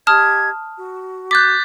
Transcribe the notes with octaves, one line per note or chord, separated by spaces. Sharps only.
G4 D#5 A5 D#6 F6 G#6
F#4
D6 F#6 G6 A6 B6